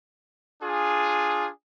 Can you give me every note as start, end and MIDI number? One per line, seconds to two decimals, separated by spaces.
0.62 1.50 62
0.62 1.50 65
0.62 1.50 68